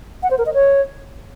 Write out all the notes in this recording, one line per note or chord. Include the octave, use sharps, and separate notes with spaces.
F#5
C5
A#4
D#5
C#5